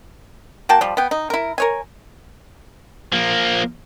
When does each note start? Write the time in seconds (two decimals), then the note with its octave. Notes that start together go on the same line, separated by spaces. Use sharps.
0.69 A#3 F#4 G5 A5
0.81 F3 G3
0.97 B3 G5
1.11 D#4
1.30 E4 A#4
1.58 A#4 C#5 G#5
3.12 F3 A#3